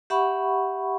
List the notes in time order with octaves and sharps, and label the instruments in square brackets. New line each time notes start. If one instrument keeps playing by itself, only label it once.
[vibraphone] G4 E5 F#5 B5 C#6